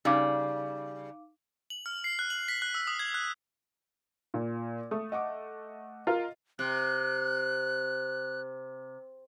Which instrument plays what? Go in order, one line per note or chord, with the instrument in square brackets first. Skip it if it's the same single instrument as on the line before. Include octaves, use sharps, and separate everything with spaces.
[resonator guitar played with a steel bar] C#3 G3 [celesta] D#4 F5 D6
[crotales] F#7
F6
C7
F#6
F#7
B6
F#6
E6
D#6
G#6
F#6
[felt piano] A#2
[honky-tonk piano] A3 [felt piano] D#6
[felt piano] D#5 F#5 D6
[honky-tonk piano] F4 A#4 F5
[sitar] C3 [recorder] F#6